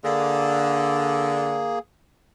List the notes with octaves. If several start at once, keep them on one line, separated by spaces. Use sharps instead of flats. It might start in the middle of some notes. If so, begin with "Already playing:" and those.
D3 A#3 G#4